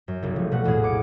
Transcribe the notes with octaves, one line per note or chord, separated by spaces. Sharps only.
F#2
F#1 C2
F3 A3
B2 A3 F#5
A#1 E2 A2 G#4
D6 C#7